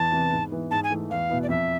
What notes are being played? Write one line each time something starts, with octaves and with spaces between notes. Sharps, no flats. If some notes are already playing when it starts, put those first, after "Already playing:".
Already playing: E2 A5
C3 E3 B3
G#2
E3 B3
G#2 A5
G#5
E3 A3
E2 F5
B2 B3 E4
D5
F2 E5